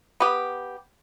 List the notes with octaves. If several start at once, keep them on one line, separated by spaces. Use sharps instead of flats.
B3 G4